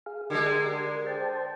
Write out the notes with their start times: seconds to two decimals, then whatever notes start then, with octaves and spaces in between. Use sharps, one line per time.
0.06 G#4 F5
0.30 D3 G#3 G4 A#4
1.07 C5 G5 A5